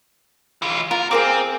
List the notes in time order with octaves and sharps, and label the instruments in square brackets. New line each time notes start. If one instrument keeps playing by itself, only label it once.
[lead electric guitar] E3 F4
[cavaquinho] F4 [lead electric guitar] A#4
[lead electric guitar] C4 [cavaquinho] G#4 A#4 D6